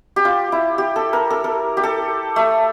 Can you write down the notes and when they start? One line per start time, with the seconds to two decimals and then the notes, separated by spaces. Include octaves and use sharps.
0.16 G4
0.25 F4
0.52 E4
0.78 G4
0.96 A4
1.13 A#4
1.30 A4
1.44 A#4
1.77 G4
1.83 A4
2.36 A3